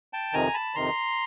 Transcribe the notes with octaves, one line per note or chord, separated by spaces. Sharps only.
G5 A5
F2 C3 D#3 G#5 A#5
A5 B5
F2 C3 D#3 A#5 C6